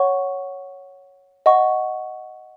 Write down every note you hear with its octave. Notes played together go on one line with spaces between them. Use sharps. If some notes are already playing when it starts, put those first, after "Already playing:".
Already playing: C#5 F#5 C#6
D#5 F#5 C#6